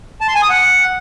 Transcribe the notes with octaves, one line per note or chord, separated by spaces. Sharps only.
A5
C6
G#5
D#6
F#5